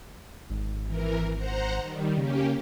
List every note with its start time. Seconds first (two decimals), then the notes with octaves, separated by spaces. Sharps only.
0.50 G#1
0.85 E3 A#4
1.36 C5 F#5 A#5
1.80 D#3 G3
2.17 C#3 A#3 C#4 G4